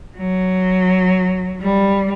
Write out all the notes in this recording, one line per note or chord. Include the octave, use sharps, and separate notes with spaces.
F#3
G3